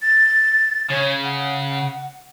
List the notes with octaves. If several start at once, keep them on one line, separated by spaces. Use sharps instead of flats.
A6
C#3 C#5
F#5